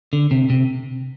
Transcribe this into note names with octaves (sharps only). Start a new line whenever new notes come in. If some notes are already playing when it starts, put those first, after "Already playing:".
D3
C3
C3